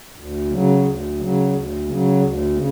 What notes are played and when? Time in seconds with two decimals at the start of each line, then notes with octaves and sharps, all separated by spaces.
0.16 D2
0.51 C#3 F#3
0.85 D2
1.19 C#3 F#3
1.53 D2
1.87 C#3 F#3
2.21 D2
2.55 C#3